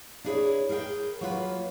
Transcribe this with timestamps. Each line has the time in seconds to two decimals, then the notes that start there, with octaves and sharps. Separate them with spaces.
0.24 D4 E4 G#4 B4 C#5
0.69 G#4 A#4 B4 F5 G5
1.21 F#3 A#3 F4 B4